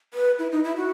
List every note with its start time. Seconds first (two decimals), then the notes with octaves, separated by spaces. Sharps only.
0.14 B4
0.39 E4
0.52 D#4
0.64 E4
0.77 F#4